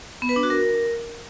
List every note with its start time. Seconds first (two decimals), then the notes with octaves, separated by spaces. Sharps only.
0.22 B3
0.29 B4
0.36 D4
0.43 F#4
0.50 A#4